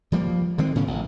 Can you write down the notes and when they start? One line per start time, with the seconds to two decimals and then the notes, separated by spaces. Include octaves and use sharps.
0.12 F3 G3 A3 A#3
0.58 D3 D#3 G#3 C4
0.75 A2 C#3 B3 C#4
0.87 A1